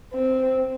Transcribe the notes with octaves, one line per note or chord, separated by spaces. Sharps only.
C4